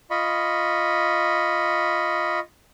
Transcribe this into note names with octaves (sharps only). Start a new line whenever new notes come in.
F4 D#5 B5 C#6